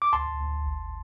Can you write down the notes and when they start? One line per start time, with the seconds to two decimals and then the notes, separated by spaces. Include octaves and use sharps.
0.02 D6
0.13 D2 A5 C6
0.40 D2
0.66 G1